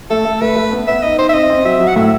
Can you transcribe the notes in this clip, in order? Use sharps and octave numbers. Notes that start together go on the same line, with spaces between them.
A3 A4
A3
A3 B4
A3
B3
B3 E5
D#4 D#5
D#4 C5
E5
C4 D#5
C4
F#3 E5
F#3
F#5
A2 E5